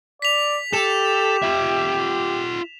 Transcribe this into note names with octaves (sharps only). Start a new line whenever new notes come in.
D5 B6 F7
G4 A4 E7
F4 E5